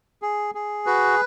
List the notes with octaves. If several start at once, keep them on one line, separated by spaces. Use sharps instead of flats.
G#4
G#4
F#4 B4